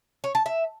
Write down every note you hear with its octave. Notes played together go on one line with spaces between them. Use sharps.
C#5
A5
E5